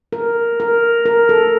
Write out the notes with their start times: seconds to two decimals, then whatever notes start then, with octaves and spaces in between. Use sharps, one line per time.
0.13 A#4
0.60 A#4
1.06 A#4
1.29 A4